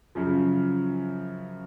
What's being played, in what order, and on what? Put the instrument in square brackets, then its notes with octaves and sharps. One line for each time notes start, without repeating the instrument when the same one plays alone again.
[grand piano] F#2 C#3 F3